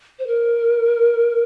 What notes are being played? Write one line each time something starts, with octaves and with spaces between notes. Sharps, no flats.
C5
A#4